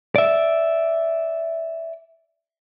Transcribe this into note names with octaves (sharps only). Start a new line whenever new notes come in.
D5 E5